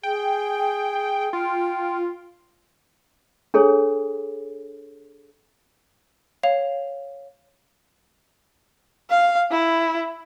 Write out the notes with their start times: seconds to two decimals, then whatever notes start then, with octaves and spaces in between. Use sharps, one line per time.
0.03 G#4 G5
1.33 F4 G5
3.54 D4 G#4 A4 C#5
6.43 C#5 F5 F7
9.10 F5
9.51 E4